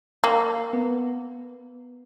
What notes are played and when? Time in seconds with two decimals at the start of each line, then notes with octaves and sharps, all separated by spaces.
0.24 A#3
0.73 B3